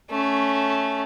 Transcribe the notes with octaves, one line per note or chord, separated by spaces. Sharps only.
A3 C#4